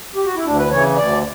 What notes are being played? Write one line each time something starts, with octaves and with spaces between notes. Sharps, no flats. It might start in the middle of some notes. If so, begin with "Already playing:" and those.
G4
F#4
E4
D2 D4
B4
C#3 E3 C#5
D2 D5